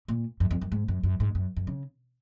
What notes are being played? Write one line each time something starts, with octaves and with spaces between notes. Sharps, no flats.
A#2
F#2
F2
F#2
G#2
F#2
F#2
G#2
F#2
F#2
C#3